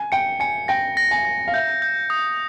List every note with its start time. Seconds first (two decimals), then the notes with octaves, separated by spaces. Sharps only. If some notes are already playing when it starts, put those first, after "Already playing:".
Already playing: G#5
0.12 G5 C#7
0.40 G#5 C#7
0.68 G5 A#6
0.97 A#6
1.11 G#5
1.25 A#6
1.48 F5
1.54 E5 G6
1.82 G6
2.10 D#6